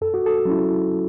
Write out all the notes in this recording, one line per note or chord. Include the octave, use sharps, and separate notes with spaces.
F#2 A4
F#4
A4
F#3 C#4 E4